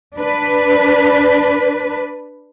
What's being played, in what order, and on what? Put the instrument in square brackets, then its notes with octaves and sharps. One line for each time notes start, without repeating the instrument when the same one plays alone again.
[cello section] D4 B4